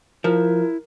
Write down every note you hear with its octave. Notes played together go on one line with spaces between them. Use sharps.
F3 E4 A#4